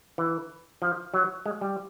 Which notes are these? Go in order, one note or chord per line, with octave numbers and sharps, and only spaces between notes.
E3
F3
F#3
G#3
G3